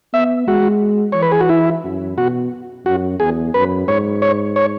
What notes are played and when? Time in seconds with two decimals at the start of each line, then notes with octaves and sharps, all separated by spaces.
0.13 B3 E5
0.47 G#3 F#4
1.12 E3 C#5
1.22 B4
1.32 G#4
1.41 F#4
1.49 E4
1.84 F#2
2.17 B2 F#4
2.86 F#2 F#4
3.20 E2 G#4
3.54 F#2 B4
3.88 G#2 C#5
4.22 C#5
4.56 C#5